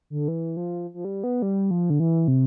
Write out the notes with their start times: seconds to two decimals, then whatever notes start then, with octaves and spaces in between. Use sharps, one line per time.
0.10 D3
0.28 E3
0.57 F3
0.94 F3
1.05 G3
1.24 B3
1.42 G3
1.71 F3
1.90 D3
2.00 E3
2.28 C3